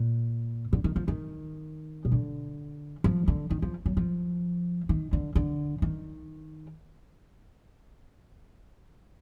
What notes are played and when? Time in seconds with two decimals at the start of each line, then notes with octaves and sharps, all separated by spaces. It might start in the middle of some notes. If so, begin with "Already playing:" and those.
Already playing: A#2
0.73 D3
0.84 D#3
0.96 F3
1.08 D#3
2.05 B2
2.12 D3
3.04 F3
3.28 D3
3.50 D#3
3.62 F3
3.86 F#3
3.97 F3
4.89 D#3
5.13 D3
5.35 D3
5.82 D#3